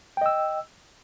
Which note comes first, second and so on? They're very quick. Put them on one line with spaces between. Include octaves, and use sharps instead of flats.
G5 D#5 E6